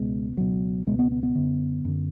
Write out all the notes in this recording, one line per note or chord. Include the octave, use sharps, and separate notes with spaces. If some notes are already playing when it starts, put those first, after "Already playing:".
Already playing: C#2 B2 G#3
C#2 B2 F#3
C#2 B2 G#3
B3
B3
B3
F#2 D3
F#2 D3